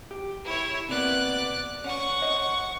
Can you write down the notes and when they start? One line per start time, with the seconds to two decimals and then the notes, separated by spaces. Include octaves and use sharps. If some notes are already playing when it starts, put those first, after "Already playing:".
0.11 G4
0.44 E4 C#5
0.89 C3 A#3 B3 D5 F#6
1.84 C#4 F#5 C#6
2.22 C5 C#5 D#5